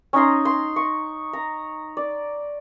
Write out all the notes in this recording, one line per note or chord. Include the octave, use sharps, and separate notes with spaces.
C#4 D#4 A#5 C6
C6
C#6
A#5
D5